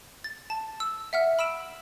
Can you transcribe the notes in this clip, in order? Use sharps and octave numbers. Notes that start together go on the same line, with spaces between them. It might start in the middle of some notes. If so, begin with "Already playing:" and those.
A6
A5
E6
E5 F#5 F6
B5 E6 D7 E7